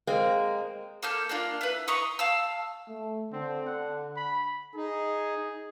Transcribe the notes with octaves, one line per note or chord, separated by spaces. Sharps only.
G#3 A#3 C4
A#3 A4 F6 G6
A#3 D4 F4
E4 B4
A#5 C6 C#6 D#6
F5 A5 E6
A3
D3 C4
F#5
B5
D#4 G#4